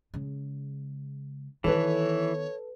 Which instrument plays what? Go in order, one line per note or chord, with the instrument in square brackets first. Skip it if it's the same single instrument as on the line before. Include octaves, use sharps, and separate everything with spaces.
[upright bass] C#3 G#3
[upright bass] D#3 B3 [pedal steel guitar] E3 [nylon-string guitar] A4 B4 [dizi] C#5